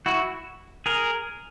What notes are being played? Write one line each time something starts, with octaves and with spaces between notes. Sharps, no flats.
E4 F#4
G#4 A#4